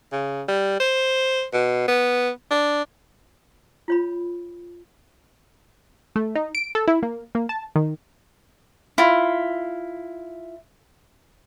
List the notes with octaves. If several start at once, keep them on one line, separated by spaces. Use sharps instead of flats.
C#3
G3
C5
B2
B3
D4
F4 C#5 B5
A3
D#4
D7
A4
E4
A#3
A#3
A5
D#3
E4 F4